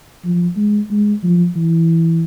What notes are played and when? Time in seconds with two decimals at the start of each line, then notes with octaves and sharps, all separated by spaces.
0.25 F3
0.56 G#3
0.91 G#3
1.23 F3
1.56 E3